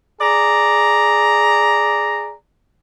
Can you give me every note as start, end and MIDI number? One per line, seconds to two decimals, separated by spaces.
0.21 2.35 68
0.21 2.35 74
0.21 2.35 82